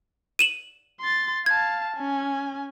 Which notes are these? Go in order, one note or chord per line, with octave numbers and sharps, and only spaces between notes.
D#7 E7 F#7
C6 A6
F5 A5 G#6
C#4 G#5